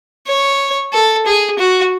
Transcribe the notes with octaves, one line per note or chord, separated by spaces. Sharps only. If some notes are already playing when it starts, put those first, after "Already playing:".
C#5
A4
G#4
F#4